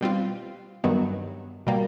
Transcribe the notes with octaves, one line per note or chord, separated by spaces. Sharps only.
B2 G3 C4 F4
G2 D#3 F#3 B3
B2 G3 A#3